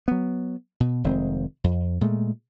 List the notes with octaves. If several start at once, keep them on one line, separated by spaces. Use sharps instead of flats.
F#3 B3
B2
F1 D#3 G#3 C4
F2
A#2 G#3 A3